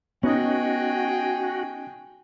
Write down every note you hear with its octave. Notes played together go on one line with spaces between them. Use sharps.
B3 C#4 D#4 F#4 G#4 D#5 G5